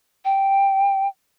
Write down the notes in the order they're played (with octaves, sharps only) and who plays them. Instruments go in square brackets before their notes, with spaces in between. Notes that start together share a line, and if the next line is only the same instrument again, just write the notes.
[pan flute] G5